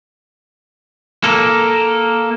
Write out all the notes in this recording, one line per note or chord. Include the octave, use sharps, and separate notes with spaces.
A#3 A4